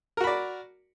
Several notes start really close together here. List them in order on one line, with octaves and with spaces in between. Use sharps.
A#4 F#4 B5 D5